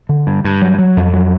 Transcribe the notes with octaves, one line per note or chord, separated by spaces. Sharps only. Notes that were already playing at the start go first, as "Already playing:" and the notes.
D3
G2
G2
F#3
F#3
F2
F#3